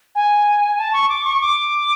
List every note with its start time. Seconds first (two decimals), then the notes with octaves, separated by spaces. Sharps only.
0.15 G#5
0.78 A5
0.93 C#6
1.09 D6
1.24 C#6
1.41 D6